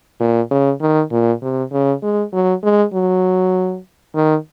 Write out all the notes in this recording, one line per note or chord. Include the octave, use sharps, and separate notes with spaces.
A#2
C#3
D#3
A#2
C3
C#3
G#3
F#3
G#3
F#3
D#3